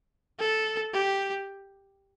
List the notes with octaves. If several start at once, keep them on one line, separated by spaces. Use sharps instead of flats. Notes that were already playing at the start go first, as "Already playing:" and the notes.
A4
G4